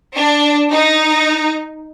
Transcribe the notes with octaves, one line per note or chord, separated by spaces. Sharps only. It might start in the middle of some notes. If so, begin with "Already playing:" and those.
D4
D#4